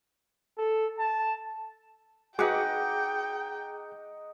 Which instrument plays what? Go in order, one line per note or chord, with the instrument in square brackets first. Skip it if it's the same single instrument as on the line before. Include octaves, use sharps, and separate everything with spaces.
[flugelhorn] A4
A5
[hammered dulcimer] D#4 F#5 D6 [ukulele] F#4 B4 [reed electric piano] G#4 [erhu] G5